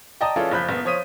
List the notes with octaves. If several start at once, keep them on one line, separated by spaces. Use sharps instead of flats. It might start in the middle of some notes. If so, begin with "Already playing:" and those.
D5 D#5 G5 A5 A#5 D#6
E3 C#4 F4 G#4 A4 D5
F#1 F3 B5 F#6 G6 B6
F#1 B3
F3 C5 C#5 D#6 B6 D#7